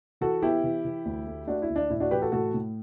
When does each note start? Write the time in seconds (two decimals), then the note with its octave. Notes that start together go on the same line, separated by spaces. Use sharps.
0.21 E3 F#4 A4
0.42 B3 E4 G4
0.64 E3
0.85 E3
1.06 D2
1.27 A3
1.47 A3 D4 F#4
1.62 E4
1.70 D2
1.76 D4
1.90 A2 E4
2.00 D4 F#4
2.11 E3 G4 B4
2.22 F#4 A4
2.32 A2 F#4 A4
2.54 A2